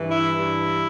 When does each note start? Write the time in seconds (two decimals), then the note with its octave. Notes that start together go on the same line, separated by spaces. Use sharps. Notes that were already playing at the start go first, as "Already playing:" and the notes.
Already playing: G2 E3
0.11 E4
0.33 G2 E3